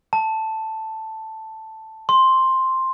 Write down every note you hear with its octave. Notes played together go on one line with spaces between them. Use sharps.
A5
C6